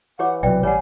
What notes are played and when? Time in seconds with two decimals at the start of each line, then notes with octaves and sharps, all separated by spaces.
0.19 E3 G4 C#5 F#5 D6
0.43 B1 C3 F#3 B4 D5 E5 G5
0.63 A1 G3 C#5 F#5 G#5